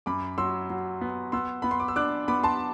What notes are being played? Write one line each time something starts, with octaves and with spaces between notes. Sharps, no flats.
F#2 B5 D6
F#3 C6 E6
F#3
B3
B3 C6 E6
B3 B5
C6
D6
E6
D4 D6 F#6
B3 B5 D6
A5 C6